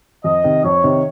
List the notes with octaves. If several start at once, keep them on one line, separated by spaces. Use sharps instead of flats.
F2 D#5
C3 D#3
F2 C#5
C3 D#3